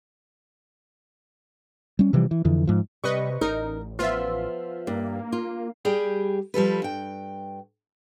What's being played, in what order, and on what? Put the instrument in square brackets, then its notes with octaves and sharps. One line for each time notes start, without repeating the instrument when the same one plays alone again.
[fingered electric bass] G3 C#4
C3 E3 F3 G3
E3
F2 D3 E3
G#2 F3
[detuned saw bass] C3 [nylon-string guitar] G3 [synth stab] B4 D#5 C#6
[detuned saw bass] A1 [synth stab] D#4 [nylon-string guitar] A#4
[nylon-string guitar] F3 B3 [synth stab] F4 E5
[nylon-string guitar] G2 [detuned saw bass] A#3
[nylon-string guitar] F4
[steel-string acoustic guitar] G3 G4 G#4 G5
F3 G3 A4 B4
G2 G5